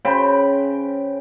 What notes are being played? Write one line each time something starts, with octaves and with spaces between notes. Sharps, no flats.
C#3 C5 G5 B5